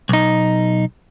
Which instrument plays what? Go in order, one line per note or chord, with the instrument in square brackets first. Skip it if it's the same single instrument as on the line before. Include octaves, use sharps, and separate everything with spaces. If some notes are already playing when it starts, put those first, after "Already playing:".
[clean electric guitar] B1 D#4